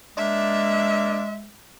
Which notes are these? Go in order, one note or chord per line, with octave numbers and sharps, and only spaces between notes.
G#3 A#3 D4 E5